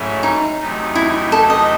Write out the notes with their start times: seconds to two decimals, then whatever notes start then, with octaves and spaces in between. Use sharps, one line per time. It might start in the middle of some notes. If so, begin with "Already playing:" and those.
Already playing: G#2 F#3 A3 C#4 E4
0.23 D#4
0.60 E2 C3 F#3 A3 D#4
0.95 E4
1.32 A4
1.50 D#5